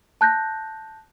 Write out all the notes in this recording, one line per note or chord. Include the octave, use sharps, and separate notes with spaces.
A5 F#6 G6 A#6